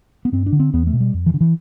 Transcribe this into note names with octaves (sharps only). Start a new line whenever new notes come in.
B3
G2 C4
D4
D3
C4
E2 B3
A3
B2
G3
F2
E3
D3
E3